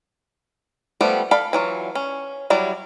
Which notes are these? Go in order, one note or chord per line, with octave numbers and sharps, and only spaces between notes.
F3 G3 A3 B3 G4
A4 D5 F5 B5
E3 F#3 F4
C#4
F#3 G3 E4 D5